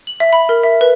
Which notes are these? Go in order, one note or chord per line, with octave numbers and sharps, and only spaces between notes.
F#7
E5
B5
A#4
E5
B4